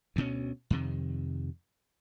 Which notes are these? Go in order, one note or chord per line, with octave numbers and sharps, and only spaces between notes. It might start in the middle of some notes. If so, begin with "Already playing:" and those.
D2 B2 C#4
F2 C3 D#3